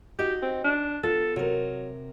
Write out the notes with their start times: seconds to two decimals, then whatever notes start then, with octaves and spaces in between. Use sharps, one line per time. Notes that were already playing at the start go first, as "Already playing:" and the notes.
0.19 D#4 F#4 G4 D#5
0.42 C4
0.64 D4
1.03 B3 F4 A4
1.36 C3 F#3 A#4